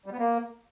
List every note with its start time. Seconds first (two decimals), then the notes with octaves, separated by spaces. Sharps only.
0.06 G3
0.12 B3
0.19 A#3